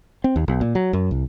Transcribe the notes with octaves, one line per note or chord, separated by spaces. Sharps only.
C4
D#2
B1
A#2
F#3
F#2
C2